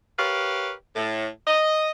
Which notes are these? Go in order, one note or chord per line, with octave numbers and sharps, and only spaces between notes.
G4 A#4 B4 C#5 F5
A2
D#5